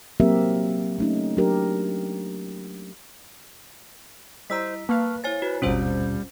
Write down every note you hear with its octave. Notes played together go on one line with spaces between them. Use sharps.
F#3 A#3 C4 G4 A#4 E5
A3 C#4 D#4
F#3 A#3 D4 G4 A#4
G3 E4 C5 D#5 A#5 E6 B6
A#3 B4 F5 A5 C#6 F6
E4 C5 C#5 G#5 A6
F#4 B4
G#1 D#2 B2 G3 C4 C#4 F4 C5